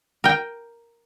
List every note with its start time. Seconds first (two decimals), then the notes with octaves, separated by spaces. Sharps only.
0.24 A#4 G5